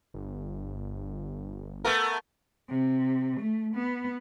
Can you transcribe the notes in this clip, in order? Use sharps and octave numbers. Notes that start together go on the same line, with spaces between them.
G1
A3 B3 A#4
C3
A3
B3